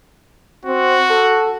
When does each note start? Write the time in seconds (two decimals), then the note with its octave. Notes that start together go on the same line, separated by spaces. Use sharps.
0.66 C4 F#4
1.10 A4